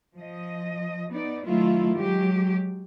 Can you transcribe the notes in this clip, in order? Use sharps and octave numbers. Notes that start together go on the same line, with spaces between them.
F3 D#5
B3 D#4 D5
D#3 F#3 A3 E4 F4
F#3 G#3 G4